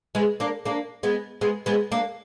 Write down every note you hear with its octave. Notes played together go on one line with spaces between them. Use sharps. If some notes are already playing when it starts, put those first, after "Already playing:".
G#3 B3
A#3 D4
A#3 D4
G#3 B3
G#3 B3
G#3 B3
A#3 D4